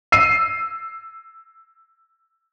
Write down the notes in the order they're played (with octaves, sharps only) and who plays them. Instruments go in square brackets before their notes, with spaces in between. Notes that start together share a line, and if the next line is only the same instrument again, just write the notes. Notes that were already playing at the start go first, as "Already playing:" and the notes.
[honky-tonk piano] E6 C7 D#7